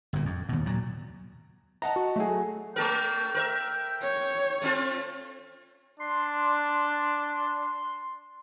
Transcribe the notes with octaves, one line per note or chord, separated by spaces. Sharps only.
G1 A#2
F2
D#2 B2
A#2 F#3
D#5 F#5 A5 A#5
F#4
F#3 A3 G#4
A3 A4 A#4 G5
A#4 B4 E5
C#5
A3 C4 F4
D4 C6